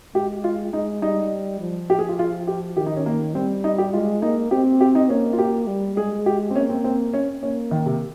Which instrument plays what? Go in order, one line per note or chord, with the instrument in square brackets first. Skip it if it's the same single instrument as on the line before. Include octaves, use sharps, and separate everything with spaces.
[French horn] G#3 [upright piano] G4
[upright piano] F4
[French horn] G#3 [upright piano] D#4
[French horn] G3 [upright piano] D#4
[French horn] F3
[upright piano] G4
G#4
F4
F4
G4
[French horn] D#3 [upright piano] G4
[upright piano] D#4
C#4
A#3
[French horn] G3 [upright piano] C4
[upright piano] D#4
G4
[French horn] G#3 [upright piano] F4
[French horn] A#3 [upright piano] D#4
[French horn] C4 [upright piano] G4
[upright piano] G4
D#4
[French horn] A#3 [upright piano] C#4
[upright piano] F4
G4
[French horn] G3
[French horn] G#3 [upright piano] G#4
[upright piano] G4
C4
[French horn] A#3 [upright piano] C#4
[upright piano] C4
C4
C#4
[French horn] A#3 [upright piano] C#4
[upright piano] D#3
C3